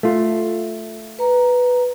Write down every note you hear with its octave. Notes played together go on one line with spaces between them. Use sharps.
A3 F4
B4 A#5